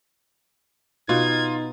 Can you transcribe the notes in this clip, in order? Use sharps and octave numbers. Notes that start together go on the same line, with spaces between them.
B2 D#4 F4 G#6